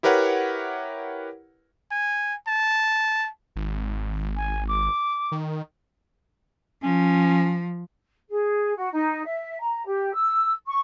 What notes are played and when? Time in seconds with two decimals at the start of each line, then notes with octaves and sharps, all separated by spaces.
0.03 E4 G4 A#4 B4 C#5 F#5
1.91 G#5
2.48 A5
3.56 G#1
4.36 G#5
4.68 D6
5.32 D#3
6.83 F3 C#4
8.30 G#4
8.77 F#4
8.93 D#4
9.25 E5
9.61 A#5
9.86 G4
10.14 E6
10.67 C#6